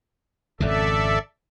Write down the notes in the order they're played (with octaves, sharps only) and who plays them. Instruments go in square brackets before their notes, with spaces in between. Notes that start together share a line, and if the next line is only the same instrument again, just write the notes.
[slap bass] G#1 F2 C#3 [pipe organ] A4 D5 E5